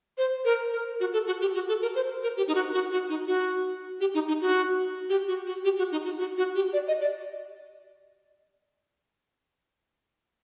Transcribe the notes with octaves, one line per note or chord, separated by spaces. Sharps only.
C5
A#4
A#4
F#4
A4
F#4
G4
F#4
A4
A#4
C5
A#4
G4
D#4
F#4
F#4
F#4
D#4
F#4
G4
D#4
D#4
F#4
G4
F#4
F#4
G4
F#4
D#4
F#4
F#4
F#4
G4
D5
D#5
D5